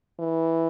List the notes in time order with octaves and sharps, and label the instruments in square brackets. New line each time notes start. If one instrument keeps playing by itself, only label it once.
[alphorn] E3